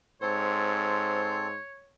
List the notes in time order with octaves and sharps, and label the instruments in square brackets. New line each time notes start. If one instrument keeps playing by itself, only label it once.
[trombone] G#2 [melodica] C4 A4 [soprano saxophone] C5 [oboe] C#5